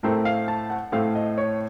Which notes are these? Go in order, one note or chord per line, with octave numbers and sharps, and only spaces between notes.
A2 A3 C4 A#4
F5
A5
F#5
A2 A3 C4 F5
D#5
C#5